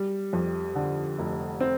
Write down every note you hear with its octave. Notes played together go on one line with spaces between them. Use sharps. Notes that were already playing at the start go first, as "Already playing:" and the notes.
Already playing: G3
F2
D3
F1
C4